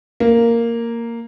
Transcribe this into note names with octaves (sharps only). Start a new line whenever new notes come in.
A#3